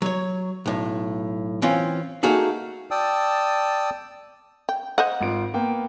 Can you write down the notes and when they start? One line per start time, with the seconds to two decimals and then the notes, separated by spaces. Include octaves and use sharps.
0.02 F#3 C#5
0.66 B1 A2
1.62 E3 C4 C#4 F4
2.23 A3 A#3 D#4 F#4 G#4 A4
2.91 D5 G5 A5 D#6 E6
4.69 G5
4.98 C5 D#5 F#5
5.21 G#1 F4 D7
5.54 A#3 B3 G5